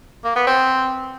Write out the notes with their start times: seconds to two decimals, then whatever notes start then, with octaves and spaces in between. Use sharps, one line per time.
0.24 A#3
0.36 B3
0.47 C4